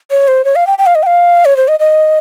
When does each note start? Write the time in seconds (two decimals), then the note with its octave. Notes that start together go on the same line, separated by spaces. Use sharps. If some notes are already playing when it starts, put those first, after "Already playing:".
0.11 C#5
0.28 C5
0.45 C#5
0.56 F5
0.67 G5
0.78 G5
0.86 F5
0.95 D#5
1.03 G5
1.06 F5
1.45 C#5
1.57 C5
1.68 D#5
1.80 D#5